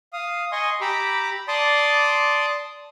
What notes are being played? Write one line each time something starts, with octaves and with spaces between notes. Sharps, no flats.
F5 D#6
D#5 G#5 C6 C#6 D#6
G4 A#5 B5 D6 E6
D5 A5 C6 D6 D#6